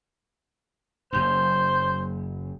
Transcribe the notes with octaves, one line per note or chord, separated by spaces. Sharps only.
F#1 F#2 C5